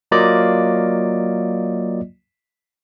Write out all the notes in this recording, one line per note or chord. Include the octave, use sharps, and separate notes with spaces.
F#3 A#3 F4 D5 D#5